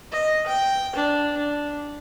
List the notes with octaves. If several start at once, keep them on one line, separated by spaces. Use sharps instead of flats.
D#5
G5
D4
D4